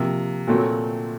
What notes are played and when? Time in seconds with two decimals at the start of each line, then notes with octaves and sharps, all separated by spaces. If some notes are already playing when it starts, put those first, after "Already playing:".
Already playing: C3 F3 A#3
0.47 A#2 F#3 A3 C4